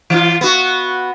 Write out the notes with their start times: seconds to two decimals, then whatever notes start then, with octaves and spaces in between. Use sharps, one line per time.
0.10 E3 F4
0.41 B3 F#4